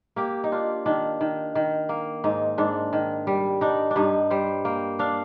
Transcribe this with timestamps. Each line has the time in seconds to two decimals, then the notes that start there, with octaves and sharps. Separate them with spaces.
0.16 A#3 G4
0.44 D#4
0.52 D4 F4
0.86 D#3 D4
1.21 D#3
1.55 D#3
1.89 A#3
2.24 G#2 D#4
2.58 G#2 D4
2.93 D#3
3.27 G3
3.61 D4 D#4
3.91 D4
3.96 G2 D#4
4.30 G3 C5
4.65 A#3 G5
4.99 D4 F5